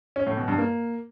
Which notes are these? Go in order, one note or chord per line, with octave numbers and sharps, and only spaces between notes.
C#4
A2
B2
G2
A#3